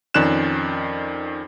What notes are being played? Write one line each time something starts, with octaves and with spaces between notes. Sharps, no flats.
F2 D#3 C#4 D5 F#6 E7